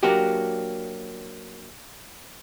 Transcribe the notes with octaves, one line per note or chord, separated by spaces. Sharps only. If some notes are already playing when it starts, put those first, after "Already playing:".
F#3 A#3 D4 F#4 G4